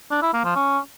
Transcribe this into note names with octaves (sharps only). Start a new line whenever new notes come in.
D4
E4
A#3
F3
C#4